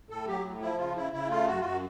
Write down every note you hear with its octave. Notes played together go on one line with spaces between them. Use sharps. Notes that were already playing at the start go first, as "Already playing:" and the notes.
A2 A4
F#3 G4
A2
F3 E4
C#3 F4
C#3 E4
C#3 E4
A3 F4
F#2 F#4
F4
F#2 F#4